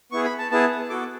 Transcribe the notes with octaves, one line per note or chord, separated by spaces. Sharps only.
B3 E4 G#4 C#6
B5
A5
B3 E4 G#4 A5
B3 F#4 A4 D6